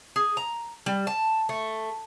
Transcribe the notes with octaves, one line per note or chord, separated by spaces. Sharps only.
G#4
A#5
G3
A5
A3